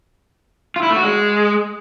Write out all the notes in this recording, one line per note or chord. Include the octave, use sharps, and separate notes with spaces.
F4
E4
A3
F#4
G#3